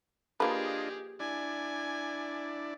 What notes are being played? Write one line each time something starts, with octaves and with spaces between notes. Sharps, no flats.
F3 A#3 D4 F4 G4 G#4 B4 D#5
D4 E4 D5 G#5